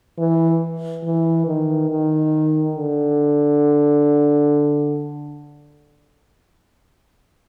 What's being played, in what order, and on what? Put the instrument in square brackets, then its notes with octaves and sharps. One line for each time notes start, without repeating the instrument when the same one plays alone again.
[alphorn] E3
E3
D#3
D#3
D3